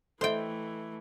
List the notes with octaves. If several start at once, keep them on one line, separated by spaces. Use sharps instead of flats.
E3 A3 A4 C5 D#5 E5 G5